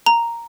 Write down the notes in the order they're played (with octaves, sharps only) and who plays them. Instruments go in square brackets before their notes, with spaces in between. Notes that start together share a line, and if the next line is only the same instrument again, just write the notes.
[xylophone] A#5